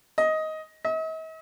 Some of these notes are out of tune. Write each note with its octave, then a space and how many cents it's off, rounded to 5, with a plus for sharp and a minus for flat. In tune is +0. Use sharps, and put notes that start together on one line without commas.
D#5 +10
D#5 +45